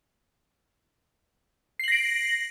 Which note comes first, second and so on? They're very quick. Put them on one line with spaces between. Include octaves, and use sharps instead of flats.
C7 F#7 A#6 D7